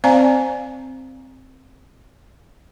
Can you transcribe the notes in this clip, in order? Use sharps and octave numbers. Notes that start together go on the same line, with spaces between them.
C4 C5 D5 F5 G#5 A#5